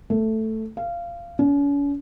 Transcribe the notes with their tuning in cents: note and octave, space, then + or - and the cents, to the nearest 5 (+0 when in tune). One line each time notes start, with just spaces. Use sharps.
A3 +5
F5 -20
C#4 +40